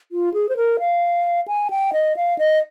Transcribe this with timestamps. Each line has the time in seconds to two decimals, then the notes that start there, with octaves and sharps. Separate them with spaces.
0.12 F4
0.34 G#4
0.49 C5
0.57 A#4
0.79 F5
1.48 G#5
1.70 G5
1.93 D#5
2.16 F5
2.38 D#5